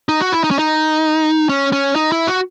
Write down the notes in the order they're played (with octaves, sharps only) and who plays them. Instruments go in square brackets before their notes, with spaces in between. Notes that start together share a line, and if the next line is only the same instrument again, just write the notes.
[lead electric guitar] D#4
F#4
E4
D#4
C#4
D#4
C#4
C#4
D#4
E4
F#4